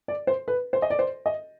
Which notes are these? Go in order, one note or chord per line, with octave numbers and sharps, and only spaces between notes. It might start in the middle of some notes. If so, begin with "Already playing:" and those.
D5
C5
B4
C5
D#5
D5
C5
D#5